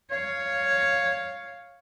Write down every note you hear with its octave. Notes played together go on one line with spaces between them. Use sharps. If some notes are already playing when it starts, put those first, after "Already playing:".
C#5 F5